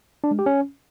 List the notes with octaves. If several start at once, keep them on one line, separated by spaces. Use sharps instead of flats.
D4
G#3
G4
C#4